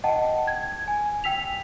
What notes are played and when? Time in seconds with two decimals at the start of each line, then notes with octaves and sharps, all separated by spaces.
0.04 D#5 F#5 G5 A5
0.48 G#6
0.88 G#5
1.24 G5 E6 B6 F7